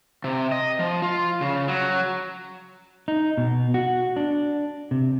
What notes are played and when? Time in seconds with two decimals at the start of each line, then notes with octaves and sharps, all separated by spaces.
0.24 C3
0.52 D#5
0.79 F3
1.02 F4
1.41 C#3
1.68 F#3
3.08 D#4
3.37 B2
3.74 F#4
4.16 D4
4.91 C3